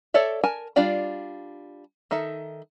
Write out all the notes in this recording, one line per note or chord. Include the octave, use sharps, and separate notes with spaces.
A4 C#5 D5 E5
A#4 G#5 A5
G3 D4 F4 D5 G5
D#3 D#4 A4 E5